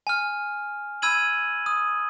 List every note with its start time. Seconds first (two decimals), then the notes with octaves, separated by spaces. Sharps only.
0.07 G#5 F6
1.02 B5 E6 G#6 D#7 F#7
1.66 D#6